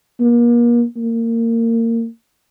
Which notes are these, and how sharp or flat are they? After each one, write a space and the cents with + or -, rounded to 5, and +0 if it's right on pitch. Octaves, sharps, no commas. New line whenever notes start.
A#3 +35
A#3 -25